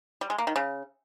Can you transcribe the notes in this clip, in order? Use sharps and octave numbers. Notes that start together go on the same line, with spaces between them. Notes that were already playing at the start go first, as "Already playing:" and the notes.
G3
G#3
A#3
D#3
C#3